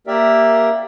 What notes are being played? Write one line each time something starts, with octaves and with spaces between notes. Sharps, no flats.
A#3 G4 A#4 D5 E5